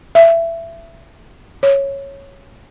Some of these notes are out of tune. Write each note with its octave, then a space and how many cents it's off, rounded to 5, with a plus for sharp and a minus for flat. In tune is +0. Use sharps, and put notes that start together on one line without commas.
E5 +20
C#5 -5